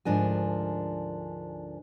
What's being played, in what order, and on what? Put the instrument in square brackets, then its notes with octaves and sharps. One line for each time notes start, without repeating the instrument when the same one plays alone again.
[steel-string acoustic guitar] D2 G#2 F3 D4 A#4 G#5